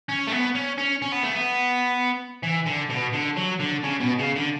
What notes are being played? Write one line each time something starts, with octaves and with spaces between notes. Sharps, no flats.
C#4
A3
B3
C#4
C#4
C#4
B3
A3
B3
E3
D3
B2
D3
F#3
D3
C#3
B2
C#3
D3